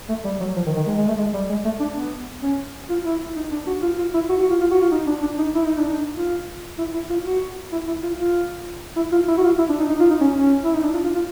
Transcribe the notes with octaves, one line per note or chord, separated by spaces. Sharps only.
A3
G3
F#3
F3
D#3
D#3
G#3
G#3
A3
G#3
G3
G#3
A3
D4
B3
C#4
F4
E4
D#4
D4
F#4
F4
F4
E4
F#4
F#4
F4
F4
F#4
F4
D#4
D4
D4
D#4
E4
D#4
D4
D#4
F4
E4
E4
F4
F#4
E4
E4
F4
F4
E4
F4
E4
F#4
F4
E4
D4
D#4
D#4
F4
D#4
C#4
C#4
E4
D#4
D4
F4
F4
F4